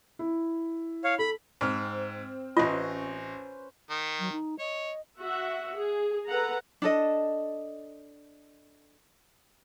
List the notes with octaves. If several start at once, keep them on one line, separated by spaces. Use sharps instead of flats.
E4
C#5 F5
A4 B5
G#2 C4 F6
A1 C#4 F4 B4 C5 D#5
D#3
F#3
D#4
C#5 D#5
F#4 E5 F#5
G#4
A4 B4 F#5 A#5
D4 A4 D#5